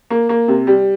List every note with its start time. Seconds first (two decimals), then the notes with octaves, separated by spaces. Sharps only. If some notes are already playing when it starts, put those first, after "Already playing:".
0.10 A#3
0.29 A#3
0.48 C3
0.67 G3